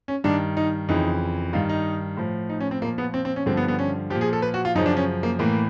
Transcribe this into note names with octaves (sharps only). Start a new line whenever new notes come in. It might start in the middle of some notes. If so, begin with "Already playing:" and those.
C#4
G2 D#3 D4
D#4
F2 C#3 E3 D#4
G2 D#3 F4
D#4
A2 F3
D#4
C#4
C4
A#2 F3 A#3
B3
C4
C4
C#4
G2 D3 F3 C4
B3
B3
C#4
A#2 F3 G4
G#4
A4
B4
F#4
F4
F#2 C#3 F3 D#4
D4
C#4
A#3
A2 E3 A#3